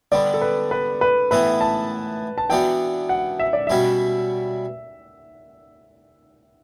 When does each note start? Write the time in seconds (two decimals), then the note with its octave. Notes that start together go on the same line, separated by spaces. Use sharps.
0.12 D3 G3 B3 D5
0.34 A4
0.42 B4
0.71 B4
1.01 B4
1.31 A2 E3 B3 E4 B4
1.61 A5
2.38 A5
2.50 E3 B3 D4 F#4 G5
3.09 F#5
3.40 E5
3.53 D5
3.67 B2 G3 C#4 F#4 E5